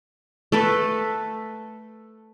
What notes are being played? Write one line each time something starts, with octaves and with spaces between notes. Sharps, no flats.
A3 A4 B4